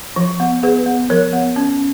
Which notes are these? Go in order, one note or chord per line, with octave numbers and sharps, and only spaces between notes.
F3
B3
B3 G#4 B4
B3
F3 A#4 C#5
B3
C#4